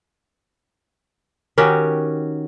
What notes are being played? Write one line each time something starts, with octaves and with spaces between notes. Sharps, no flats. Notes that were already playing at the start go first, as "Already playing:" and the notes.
D#3 C#4 F#4 G4